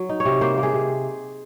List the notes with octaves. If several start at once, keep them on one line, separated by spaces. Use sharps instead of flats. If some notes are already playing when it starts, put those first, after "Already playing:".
Already playing: F#3
D#4
C#5
C3
A#3 C5
A#3
G#4
C3